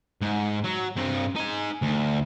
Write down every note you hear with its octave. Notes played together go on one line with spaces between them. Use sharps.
G#2
F#3
G2 C4
D#4 G#5
D2